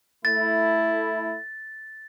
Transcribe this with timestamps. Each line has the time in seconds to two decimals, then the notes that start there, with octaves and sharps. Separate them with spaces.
0.25 A3 E4 A6